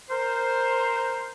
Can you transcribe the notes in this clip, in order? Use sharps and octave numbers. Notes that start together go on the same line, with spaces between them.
A#4 C5